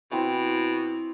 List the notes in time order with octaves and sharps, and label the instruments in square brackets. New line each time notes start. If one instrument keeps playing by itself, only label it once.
[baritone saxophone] B2 [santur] C4 E4 G#5